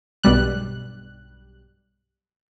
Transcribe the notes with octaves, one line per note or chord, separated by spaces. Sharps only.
B1 G2 B2 G3 F#6